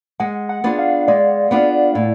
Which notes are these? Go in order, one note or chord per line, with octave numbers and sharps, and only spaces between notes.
G#3 F#5
F#5
B3 D4 F4 G#4
F5
G#3 D5
B3 D4 F4 G#4
A2